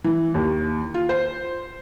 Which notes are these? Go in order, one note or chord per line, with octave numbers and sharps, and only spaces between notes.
E3
D#2
F4
C5